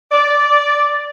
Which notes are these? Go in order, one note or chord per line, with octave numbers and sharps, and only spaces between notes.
D5